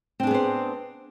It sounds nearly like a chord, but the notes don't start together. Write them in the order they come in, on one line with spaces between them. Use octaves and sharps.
C4 D4 G#4 B3 C5